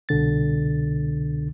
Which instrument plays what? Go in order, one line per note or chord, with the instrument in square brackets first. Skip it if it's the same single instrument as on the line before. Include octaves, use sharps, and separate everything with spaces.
[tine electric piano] C2 B2 D3 A6